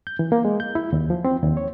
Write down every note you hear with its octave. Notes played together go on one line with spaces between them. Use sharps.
G6
E3
A#3
G#3
G6
E4
D#2
F3
C4
D#2
C#5